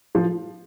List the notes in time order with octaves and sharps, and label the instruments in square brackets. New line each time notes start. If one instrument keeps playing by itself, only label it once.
[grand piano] F3